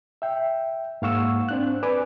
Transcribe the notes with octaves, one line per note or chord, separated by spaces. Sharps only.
E5 G5
G#2 A#3 F5 F#5 C#6 E6
C4 D4 F#6
B4 D5 G#5 D6